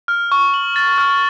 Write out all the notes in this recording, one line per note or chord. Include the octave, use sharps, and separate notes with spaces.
F6
C#6
F#7
A6
F6